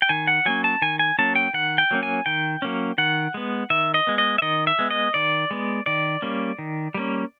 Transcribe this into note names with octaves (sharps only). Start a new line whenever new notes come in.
G5
D#3 G#5
F#5
F#3 A#3 C#4 G#5
A5
D#3 G#5
G#5
F#3 A#3 C#4 A5
G5
D#3 F#5
G5
F#3 A#3 C#4
G#5
D#3 G5
F#3 A#3 C#4
D#3 F#5
G#3 B3
D#3 E5
D#5
G#3 B3
D#5
E5
D#3 D#5
E5
G#3 B3
D#5
D#3 D5
G#3 B3
D#3 D5
G3 A#3 C#4
D#3
G3 A#3 C#4